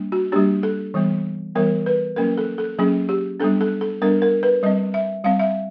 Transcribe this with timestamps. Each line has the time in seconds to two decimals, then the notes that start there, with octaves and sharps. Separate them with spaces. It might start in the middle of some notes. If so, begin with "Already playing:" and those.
Already playing: G3 A#3 D4
0.12 F#4
0.32 G3 A#3 D4 G4
0.63 A4
0.94 E3 G3 B3
1.55 E3 G3 B3 A#4
1.86 B4
2.16 F#3 A#3 C#4 A#4
2.37 A4
2.58 A4
2.78 F#3 A#3 C#4 G#4
3.09 G4
3.40 G3 B3 D4 A4
3.61 A4
3.81 A4
4.02 G3 B3 D4 A#4
4.22 A#4
4.43 B4
4.63 G3 C4 D#5
4.94 E5
5.24 G3 C4 F5
5.39 E5